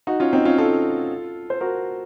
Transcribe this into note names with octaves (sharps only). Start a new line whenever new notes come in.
D#4 F#4
C#4 F4
C4 D#4
C#4 F4
F4 A4
C5
F#4 A#4